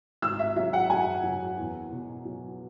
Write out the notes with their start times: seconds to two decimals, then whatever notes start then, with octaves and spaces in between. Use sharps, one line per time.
0.22 G#1 E6
0.39 E5
0.56 F#3 E5
0.73 F#5
0.90 F#2 G#5
1.23 F#3
1.57 E2
1.91 B2
2.25 F#3